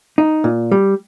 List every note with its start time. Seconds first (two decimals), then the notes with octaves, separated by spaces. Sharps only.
0.18 D#4
0.44 A#2
0.72 G3